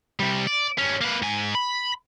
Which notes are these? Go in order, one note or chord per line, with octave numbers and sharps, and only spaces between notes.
C3 G3
D5
G2 C#4
A#3 B4
G#2 G#5
B5